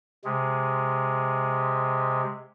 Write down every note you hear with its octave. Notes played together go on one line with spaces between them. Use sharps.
C3 G#3